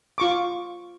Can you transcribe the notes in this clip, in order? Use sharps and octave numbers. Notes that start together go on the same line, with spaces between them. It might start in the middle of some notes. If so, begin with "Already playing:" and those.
F4 C#6 D6